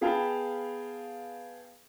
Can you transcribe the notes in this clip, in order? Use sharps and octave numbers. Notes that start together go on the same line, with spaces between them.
B3 G#4 F5 G5 A5 B5